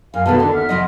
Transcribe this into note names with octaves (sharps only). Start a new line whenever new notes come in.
F#2 F5 G#5 F6
B2 D#3 A3 G#4 B4 A5
D#2 D3 D4
E5 F#5 F6
C#3 F3 D#5